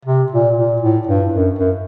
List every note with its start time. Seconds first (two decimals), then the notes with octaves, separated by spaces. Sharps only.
0.05 C3
0.32 A#2
0.57 A#2
0.82 A2
1.07 G2
1.33 F#2
1.58 F#2